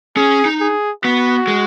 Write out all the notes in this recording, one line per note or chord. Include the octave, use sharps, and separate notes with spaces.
C#4 G#4
D#4
G#4
B3 F#4
G#3